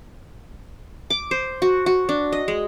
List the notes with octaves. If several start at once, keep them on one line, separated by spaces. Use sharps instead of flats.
D6
C5
F#4
F#4
D4
D#5
G#3